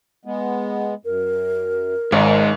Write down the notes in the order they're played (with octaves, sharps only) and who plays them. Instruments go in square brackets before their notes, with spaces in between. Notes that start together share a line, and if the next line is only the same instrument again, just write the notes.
[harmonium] G#3 B3
[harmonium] F#2 [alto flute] A#4
[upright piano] G#1 [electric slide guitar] G#2 [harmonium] C#4 E5